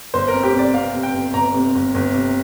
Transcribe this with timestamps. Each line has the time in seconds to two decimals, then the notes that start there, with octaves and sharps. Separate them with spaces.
0.14 G1 C5
0.28 A#4
0.34 F2
0.43 G4
0.54 C3
0.59 D5
0.74 C3 F5
0.94 C3
1.03 G5
1.14 G1
1.34 G1 A#5
1.54 C3
1.75 G1
1.94 G1
2.14 C3